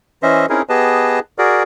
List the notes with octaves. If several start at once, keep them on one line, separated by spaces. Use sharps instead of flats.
E3 C#4 C5 D#5 E5
C4 C#4 D#4 E4 G#4 A#4
B3 G4 G#4 B4 D#5 A5
F#4 G#4 A#4 D5